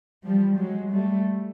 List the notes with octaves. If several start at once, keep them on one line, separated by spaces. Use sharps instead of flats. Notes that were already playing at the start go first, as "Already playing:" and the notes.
F3 G3
F#3 G#3
G3 A3